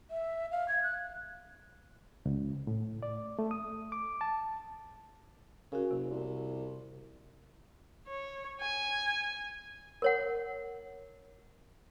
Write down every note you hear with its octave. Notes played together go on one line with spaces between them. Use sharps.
E5
F5
G#6
F#6
C#2
A2
D5
A3
D#6
D6
A5
C#3 F#4 A#4
F#1 C3
C2
C#5
G#5
A#4 C#5 F#5